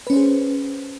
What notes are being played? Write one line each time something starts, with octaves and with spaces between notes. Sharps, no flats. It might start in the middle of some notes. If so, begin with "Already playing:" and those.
C#4 G#4 B4 C5